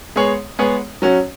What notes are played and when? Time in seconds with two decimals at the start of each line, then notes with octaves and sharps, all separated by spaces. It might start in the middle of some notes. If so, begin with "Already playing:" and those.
0.16 G#3 B3 G#4 C#5
0.59 G#3 B3 G#4 C#5
1.02 F#3 C#4 F#4